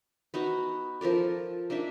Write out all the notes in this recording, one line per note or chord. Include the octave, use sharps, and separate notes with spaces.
B3 D#4 F#4
F3 A4 A#4 D5
A#3 D4 D#4 E5